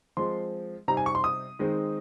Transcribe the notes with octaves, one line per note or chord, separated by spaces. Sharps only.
F3 G#3 C4 C6
C3 G3 C4 D#4 A#5
G#5
C#6
C6
D#6
D#3 G#3 C4 D#4